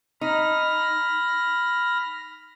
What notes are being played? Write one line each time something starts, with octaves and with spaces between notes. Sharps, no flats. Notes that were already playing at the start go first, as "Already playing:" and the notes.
D#4 B5 F6 A#6